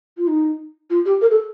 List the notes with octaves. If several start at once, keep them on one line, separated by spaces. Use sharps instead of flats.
F4
D#4
F4
G4
A#4
A4